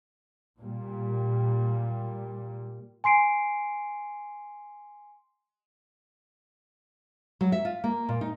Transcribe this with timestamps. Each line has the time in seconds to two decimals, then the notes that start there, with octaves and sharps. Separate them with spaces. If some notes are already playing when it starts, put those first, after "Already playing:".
0.60 A#2 G3
3.04 G#5 C6 C7 D7
7.41 F#3
7.52 E5
7.65 F4
7.84 A#3
8.09 A#2
8.21 D#4